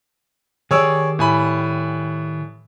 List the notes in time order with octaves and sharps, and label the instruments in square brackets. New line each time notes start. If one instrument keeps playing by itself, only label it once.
[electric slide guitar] D#3 G4 D5 [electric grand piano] G#4 C#5 E6
[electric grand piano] A2 G#5 B5